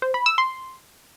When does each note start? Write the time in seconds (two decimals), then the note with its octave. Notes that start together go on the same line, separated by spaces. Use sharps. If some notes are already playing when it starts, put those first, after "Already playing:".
0.02 C5
0.14 B5
0.26 E6
0.38 C6